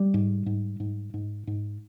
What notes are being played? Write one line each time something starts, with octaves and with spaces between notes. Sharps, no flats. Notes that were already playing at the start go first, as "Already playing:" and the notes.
Already playing: G3
G#2
G#2
G#2
G#2
G#2